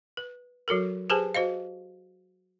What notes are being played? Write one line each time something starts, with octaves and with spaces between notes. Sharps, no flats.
B4
F#3 F#4 A4 A#4
G4 G#4 B4 C5 G#5 A5
F#4 C5 D#5 F5